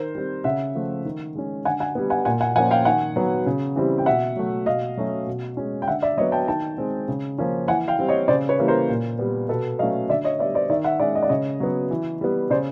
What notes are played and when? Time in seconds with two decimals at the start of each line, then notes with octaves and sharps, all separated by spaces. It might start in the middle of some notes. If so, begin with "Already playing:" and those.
Already playing: D#3 A#4 C5
0.15 G3 C4
0.44 C#3 E5 F#5
0.75 F3 A3
1.05 D#3
1.35 G#3 C#4
1.65 D3 F#5 G#5
1.80 F#5 G#5
1.95 G3 B3
2.10 F#5 G#5
2.25 A#2 F#5 G#5
2.41 F#5 G#5
2.56 F3 A#3 C#4 F#5 G#5
2.71 F5 G5
2.85 D#3 F#5 G#5
3.16 F#3 B3
3.46 C#3
3.76 E3 G3 C4
3.98 G5
4.06 B2 E5 F#5
4.36 F#3 A3
4.66 B2 D#5 F5
4.97 F#3 A3 C#4
5.27 B2
5.57 G#3 C#4
5.82 G5
5.88 D3 E5 F#5
6.02 D5 E5
6.17 F#3 C#5 D#5
6.21 B3
6.32 G5 A5
6.48 D#3 G5 A5
6.78 G#3 C4
7.08 C#3
7.38 F3 A#3 C#4
7.68 E3 F#5 G#5
7.88 F5 G5
7.99 G3 C4
8.08 C#5 D#5
8.28 C#3 C5 D5
8.49 B4 C#5
8.59 E3 G3 A#3
8.68 A#4 C5
8.89 A#2
9.19 G3 B3
9.49 B2 A4 B4
9.79 F#3 A3 C#4 D#5 F5
10.09 D3 D5 E5
10.24 C#5 D#5
10.39 B3 D5 E5
10.43 G3
10.54 C5 D5
10.70 D#3 D5 E5
10.84 E5 F#5
11.00 G#3 C#4 D5 E5
11.15 D#5
11.22 D5
11.29 C#3 C#5 D#5
11.60 F#3 B3
11.91 E3
12.21 G3 B3
12.50 C#3 C5 D5